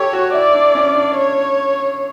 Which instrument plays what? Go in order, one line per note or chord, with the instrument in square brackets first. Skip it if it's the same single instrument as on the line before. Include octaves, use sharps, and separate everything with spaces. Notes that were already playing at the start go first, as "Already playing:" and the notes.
Already playing: [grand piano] G4 A4 [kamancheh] C#5
[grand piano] F#4
[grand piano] E4 [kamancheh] D5
[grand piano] D4
C#4
D4
[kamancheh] C#5